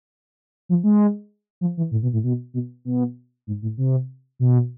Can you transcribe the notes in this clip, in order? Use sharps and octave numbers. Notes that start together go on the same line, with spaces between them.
F3
G#3
F3
E3
A2
B2
A2
B2
B2
B2
G#2
A2
C3
B2